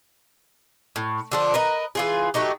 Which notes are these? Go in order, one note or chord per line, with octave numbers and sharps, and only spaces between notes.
A2
D3 F3 D4
A#4 B4 D#5
E3 F4 G#4
F#3 A3 D#4 G4